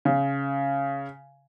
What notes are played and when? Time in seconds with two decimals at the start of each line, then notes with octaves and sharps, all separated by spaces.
0.05 C#3